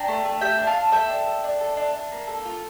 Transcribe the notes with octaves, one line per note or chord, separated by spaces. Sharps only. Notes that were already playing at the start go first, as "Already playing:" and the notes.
Already playing: D4 G5 A#5
A3
A3
G4 E5 G5
D4
F5 A5
A3
A4 E5 G5
D4
A4
D4
A4
D4
D4
A#3
A4
F4